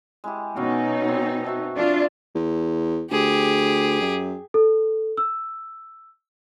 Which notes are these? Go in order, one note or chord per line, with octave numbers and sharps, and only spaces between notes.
G#3 E4 G4
B2 F#3 C#4 D#4 F5
C4
F#4 E5 A5
D4 F4
E2
D2 G4 G#4
F#2
A4
E6